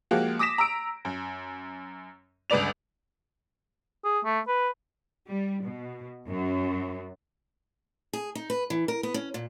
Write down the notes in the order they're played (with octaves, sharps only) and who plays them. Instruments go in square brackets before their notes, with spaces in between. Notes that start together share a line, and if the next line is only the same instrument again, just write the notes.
[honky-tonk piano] F3 G#3 A#3 F#4 G4
D6 D#6 A#6 B6 E7
A#5 E6 D7
F#2
G1 C#2 B4 D5 F7
[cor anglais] G#4
A3
B4
[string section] G3
B2
F#2
[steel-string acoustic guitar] G#4
D#4
B4
E3
A#4
B3
C#4
A#2